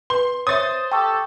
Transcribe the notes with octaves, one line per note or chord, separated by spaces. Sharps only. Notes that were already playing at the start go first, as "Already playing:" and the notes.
B4 C6
C5 C#5 E5 D#6 A6
G4 A4 G5 C#6